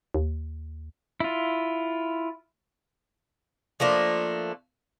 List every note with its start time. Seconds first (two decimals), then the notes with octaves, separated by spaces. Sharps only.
0.14 D#2
1.20 E4 F4
3.80 F3 A3 A#3 D4